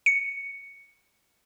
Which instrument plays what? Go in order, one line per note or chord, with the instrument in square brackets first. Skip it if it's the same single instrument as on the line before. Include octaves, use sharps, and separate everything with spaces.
[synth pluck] C#7